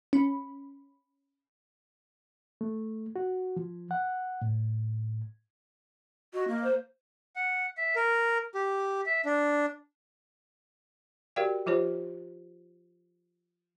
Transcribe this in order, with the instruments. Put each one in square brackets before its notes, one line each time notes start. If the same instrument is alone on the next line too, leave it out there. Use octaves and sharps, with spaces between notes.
[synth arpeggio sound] C#4 B5
[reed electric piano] A3
F#4
F3
F#5
A2
[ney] F#4 [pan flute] D#5
[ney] A#3
[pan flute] C5
[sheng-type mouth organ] F#5
E5
A#4
G4
E5
D4
[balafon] F#4 G4 A#4 D5 F5 G5
F3 F4 G4 C5 C#5